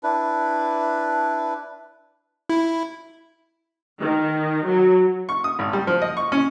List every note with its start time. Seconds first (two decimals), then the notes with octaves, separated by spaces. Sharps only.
0.03 D4 E4 B4
2.50 E4
4.00 D#3
4.66 F#3
5.29 C#6
5.44 D#6
5.59 G#1
5.73 G3
5.87 F3
6.02 D#5
6.17 C#6
6.32 C#4